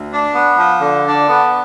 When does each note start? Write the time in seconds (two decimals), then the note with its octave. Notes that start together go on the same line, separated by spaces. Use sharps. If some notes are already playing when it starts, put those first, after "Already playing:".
Already playing: D2
0.11 D4
0.35 B3
0.59 F3
0.81 D3
1.06 D4
1.29 B3